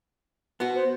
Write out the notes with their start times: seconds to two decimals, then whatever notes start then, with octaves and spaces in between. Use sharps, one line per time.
0.60 B3 F#4
0.75 C5